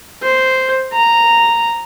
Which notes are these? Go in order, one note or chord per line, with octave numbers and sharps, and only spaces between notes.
C5
A#5